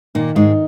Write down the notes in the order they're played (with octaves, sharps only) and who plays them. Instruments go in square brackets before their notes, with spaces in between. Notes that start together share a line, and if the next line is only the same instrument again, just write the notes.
[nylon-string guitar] A#2 A#3 [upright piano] D#3
[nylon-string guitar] G#2 G#3 [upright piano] D#4